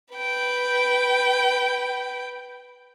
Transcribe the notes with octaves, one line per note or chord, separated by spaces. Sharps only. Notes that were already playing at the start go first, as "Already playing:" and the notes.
B4 G5